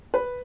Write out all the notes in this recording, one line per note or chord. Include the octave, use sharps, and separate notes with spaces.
B4